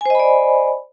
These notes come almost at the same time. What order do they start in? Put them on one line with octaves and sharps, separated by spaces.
G#5 C5 D#5 B5 D5